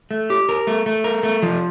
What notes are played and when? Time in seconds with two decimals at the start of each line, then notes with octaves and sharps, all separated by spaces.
0.11 A3
0.30 G4
0.49 A#4
0.67 A3
0.86 A3
1.04 A#4
1.23 A3
1.42 F3